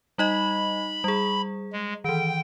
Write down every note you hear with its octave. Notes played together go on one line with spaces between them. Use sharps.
G3 D#4 D#5 B5
G3 G#4
G#3
D#3 E3 G5